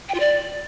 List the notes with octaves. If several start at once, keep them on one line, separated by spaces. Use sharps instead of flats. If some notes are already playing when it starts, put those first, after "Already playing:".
G5
F4
D5